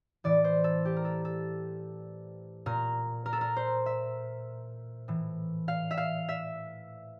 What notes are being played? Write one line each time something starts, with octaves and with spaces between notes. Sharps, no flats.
A2 E3 D5
C5
A4
G4
A#4
A4
A4
A#2 A#4
A#4
A4
A#4
C5
E5
A2 E3
F5
E5
F5
E5